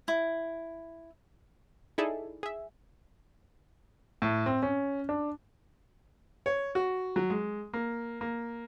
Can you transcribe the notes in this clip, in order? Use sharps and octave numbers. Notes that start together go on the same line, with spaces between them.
E4
D#4 E4 G#4 A4 D5 E5
G#4 E5
A2
C4
C#4
D4
C#5
F#4
F#3
G#3
A#3
A#3